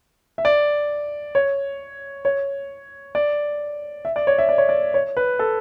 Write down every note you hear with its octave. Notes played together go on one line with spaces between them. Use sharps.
E5
D5
C#5
C#5
D5
E5
D5
C#5
E5
D5
C#5
D5
C#5
B4
A4